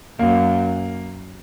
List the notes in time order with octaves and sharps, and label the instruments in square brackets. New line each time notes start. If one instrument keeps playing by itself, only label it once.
[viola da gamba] F#2 [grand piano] A#3